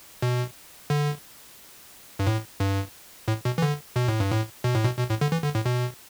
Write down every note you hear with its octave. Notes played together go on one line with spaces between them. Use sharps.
B2
D3
G2
A2
G2
A2
B2
E3
D3
B2
A2
G2
A2
B2
A2
B2
B2
A2
D3
E3
D3
A2
B2